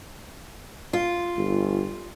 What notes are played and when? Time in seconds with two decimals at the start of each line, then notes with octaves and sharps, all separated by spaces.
0.93 F4
1.37 G1